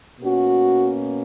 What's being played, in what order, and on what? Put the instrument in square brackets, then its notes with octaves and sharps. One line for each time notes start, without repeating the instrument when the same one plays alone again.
[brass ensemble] B2 A#3 C#4 F#4